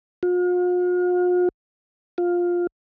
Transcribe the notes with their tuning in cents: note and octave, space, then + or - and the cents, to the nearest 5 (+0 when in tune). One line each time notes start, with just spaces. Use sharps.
F4 +45
F4 +10